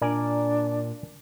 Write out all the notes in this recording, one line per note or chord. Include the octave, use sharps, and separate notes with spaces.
A#2 D4 A#4 D5 G#5